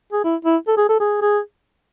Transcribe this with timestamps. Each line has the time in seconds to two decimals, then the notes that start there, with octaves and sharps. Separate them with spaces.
0.12 G#4
0.24 E4
0.45 E4
0.67 A4
0.77 G#4
0.89 A4
1.00 G#4
1.22 G#4